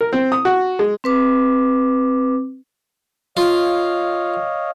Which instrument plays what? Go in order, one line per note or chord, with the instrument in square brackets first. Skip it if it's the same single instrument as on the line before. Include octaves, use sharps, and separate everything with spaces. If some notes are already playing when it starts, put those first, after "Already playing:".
[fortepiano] A#4
C4
D#6
F#4
G#3
[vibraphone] C4 B4 D6
[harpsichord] F4 [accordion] C#5 D#5 F5